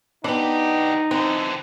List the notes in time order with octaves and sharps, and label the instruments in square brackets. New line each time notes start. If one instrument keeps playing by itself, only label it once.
[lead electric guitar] E3 G4 [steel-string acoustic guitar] B3 D4 [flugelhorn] D#4
[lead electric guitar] D3 E3 [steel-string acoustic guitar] C4